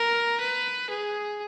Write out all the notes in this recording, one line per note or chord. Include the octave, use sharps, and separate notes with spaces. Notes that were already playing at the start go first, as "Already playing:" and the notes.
Already playing: A#4
B4
G#4